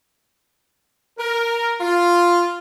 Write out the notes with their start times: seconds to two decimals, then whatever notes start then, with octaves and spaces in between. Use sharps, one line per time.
1.18 A#4
1.80 F4